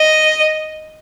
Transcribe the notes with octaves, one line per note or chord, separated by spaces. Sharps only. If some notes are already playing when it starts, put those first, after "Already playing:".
Already playing: D#5